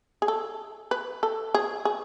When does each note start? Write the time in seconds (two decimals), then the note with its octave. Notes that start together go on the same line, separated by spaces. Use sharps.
0.22 G#4
0.28 A4
0.91 B4
1.23 A4
1.54 G#4
1.85 G#4